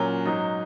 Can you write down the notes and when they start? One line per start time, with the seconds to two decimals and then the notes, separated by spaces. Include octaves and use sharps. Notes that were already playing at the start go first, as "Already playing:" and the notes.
Already playing: A#2 F#3 C#4 A#4
0.26 G#2 F#3 D#4